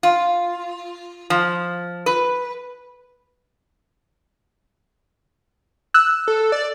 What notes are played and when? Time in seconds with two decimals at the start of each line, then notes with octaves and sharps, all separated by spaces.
0.03 F4
1.30 F3
2.06 B4
5.94 E6 F#6
6.28 A4
6.52 D5